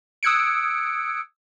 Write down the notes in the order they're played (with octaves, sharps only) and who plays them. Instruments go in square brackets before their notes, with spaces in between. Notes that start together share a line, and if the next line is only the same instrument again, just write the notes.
[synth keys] D#6 E6 F#6 G#6 C#7 D7